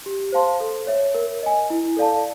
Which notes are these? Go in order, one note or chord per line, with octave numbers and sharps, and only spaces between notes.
G4
C5 F5 A5 C6
A4
C#5 E5
A#4
D#5 G#5
E4
A4 D5 F5 A5